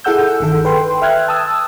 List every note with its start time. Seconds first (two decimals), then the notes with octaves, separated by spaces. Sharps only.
0.04 E4 G#4 A4 F#5 E6 G6
0.40 G1 D#3 A4
0.65 B4 G5 C6
1.02 E5 G5 F6 F#6 G#6
1.28 A5 D#6 E6